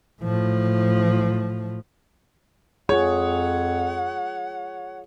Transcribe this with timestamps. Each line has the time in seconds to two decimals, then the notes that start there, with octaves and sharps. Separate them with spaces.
0.21 A2 F3
2.89 F2 F4 G#4 C#5 F#5